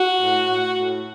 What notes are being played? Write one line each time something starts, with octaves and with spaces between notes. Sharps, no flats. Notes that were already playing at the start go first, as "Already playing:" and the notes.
Already playing: F#4
A2
A2
A2